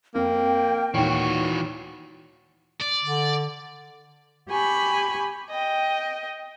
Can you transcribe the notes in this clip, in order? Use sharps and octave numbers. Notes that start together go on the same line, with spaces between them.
F2 A#3 G5
D#2 A#2 E3 F#4 C#5
D5
D3
G4 G#5 B5 C#6
D#5 G5